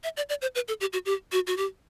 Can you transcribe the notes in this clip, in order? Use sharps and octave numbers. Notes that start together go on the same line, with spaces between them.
E5
D5
D5
C5
B4
A4
G4
F#4
G4
F#4
F#4
G4